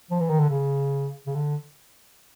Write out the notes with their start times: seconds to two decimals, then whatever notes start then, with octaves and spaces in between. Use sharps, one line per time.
0.11 F3
0.20 E3
0.30 D#3
0.40 D3
0.50 C#3
1.27 C#3
1.35 D3